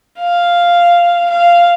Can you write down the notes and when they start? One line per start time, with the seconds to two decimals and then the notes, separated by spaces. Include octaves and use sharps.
0.20 F5
1.30 F5